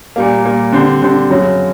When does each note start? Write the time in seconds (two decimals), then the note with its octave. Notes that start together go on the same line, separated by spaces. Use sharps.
0.16 A#2 G3 A#3
0.44 A#2 G3 A#3
0.72 D3 G3 C4
1.02 D3 G3 C4
1.30 F#2 C#3 F#3